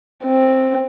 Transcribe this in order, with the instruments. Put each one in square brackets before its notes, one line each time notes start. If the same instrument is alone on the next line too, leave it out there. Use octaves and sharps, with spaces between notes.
[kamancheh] C4